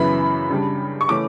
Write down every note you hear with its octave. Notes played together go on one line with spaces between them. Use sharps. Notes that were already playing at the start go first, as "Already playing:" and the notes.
Already playing: F#2 C#3 E3 B3 E4 B5
C#3 G3 D4
C#6
C#3 E3 A3 C#4 D6